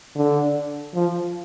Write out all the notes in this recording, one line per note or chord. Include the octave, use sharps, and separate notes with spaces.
D3
F3